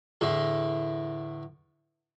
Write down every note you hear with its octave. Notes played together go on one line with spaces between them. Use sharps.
E2 A2 D3